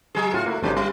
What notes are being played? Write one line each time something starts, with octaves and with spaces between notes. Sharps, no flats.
F#3 G#4
A2 F4 F#4
A3 A#3 E4 F#4
G1 G#2 C#3 F3 G4
G3